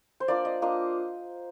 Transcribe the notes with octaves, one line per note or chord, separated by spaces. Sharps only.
C5
A#3 D4 F4 D5
D#5
A#3 D4 F4 D#5